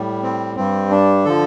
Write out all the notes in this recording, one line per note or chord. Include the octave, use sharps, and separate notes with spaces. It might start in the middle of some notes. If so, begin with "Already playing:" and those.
Already playing: A2 G3
C4
G2 G3 C4
D4
D3 F3 A4